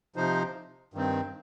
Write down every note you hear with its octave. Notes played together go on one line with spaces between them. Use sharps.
C3 F3 D#4 C5
G2 D#3 C4